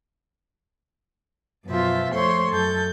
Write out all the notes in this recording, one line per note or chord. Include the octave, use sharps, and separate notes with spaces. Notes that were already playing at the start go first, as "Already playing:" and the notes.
F#2 B2 F3 F4 E5
F2 A3 C5 C#5 C6
F#2 A4 G6